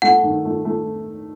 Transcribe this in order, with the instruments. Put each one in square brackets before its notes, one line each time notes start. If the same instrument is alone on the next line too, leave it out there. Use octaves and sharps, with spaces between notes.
[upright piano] A3 [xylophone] F#5
[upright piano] D#3
A3
A3